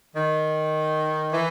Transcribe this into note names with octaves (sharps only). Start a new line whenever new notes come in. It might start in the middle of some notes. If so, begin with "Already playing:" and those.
D#3
E3